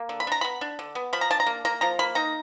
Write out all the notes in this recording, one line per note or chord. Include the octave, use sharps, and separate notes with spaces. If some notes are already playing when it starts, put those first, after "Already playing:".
Already playing: A#3
D3
B5
D4 A#5
B3 B5
D4
D3
B3
F3 B5
A#5
D4 A5
A#5
A#3
A#3 A#5
F3 A#5
A#3 B5
D#4 A#5